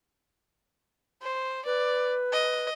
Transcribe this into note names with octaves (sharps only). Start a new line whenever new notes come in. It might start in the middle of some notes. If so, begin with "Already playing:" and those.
C5
B4 D5
D#5